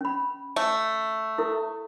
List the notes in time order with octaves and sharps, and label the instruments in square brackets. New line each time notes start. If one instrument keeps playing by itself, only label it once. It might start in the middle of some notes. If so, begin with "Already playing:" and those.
[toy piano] C#4 B5
[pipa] A3
[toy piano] E4 A4